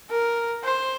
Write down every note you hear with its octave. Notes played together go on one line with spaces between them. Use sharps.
A#4
C5